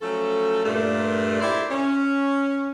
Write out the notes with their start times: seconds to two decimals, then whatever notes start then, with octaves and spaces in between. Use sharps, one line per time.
0.01 F3 F#3 A3 C#4 A4
0.63 G2 A#2 A3
1.41 A#2 E4 G4 C5 D5 E5
1.70 C#4